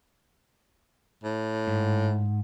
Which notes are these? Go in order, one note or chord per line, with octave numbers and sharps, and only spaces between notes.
A2
G#2